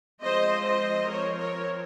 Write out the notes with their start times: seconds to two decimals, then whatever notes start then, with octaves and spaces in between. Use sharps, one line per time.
0.21 F3 G#3 C4 C5 D#5
0.65 C5 D#5
1.09 F3 C4 A#4 C#5
1.38 A#4 C#5